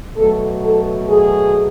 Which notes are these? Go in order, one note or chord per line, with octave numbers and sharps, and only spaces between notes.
B2 F#3 A3 A4
A4
G#4